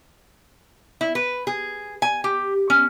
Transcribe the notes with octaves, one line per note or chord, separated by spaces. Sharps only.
E4
B4
G#4
G#5
G4
C#4